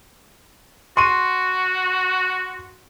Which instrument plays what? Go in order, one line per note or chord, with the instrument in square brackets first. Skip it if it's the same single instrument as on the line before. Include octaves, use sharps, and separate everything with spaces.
[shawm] F#4 [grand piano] C6 C#6 D#7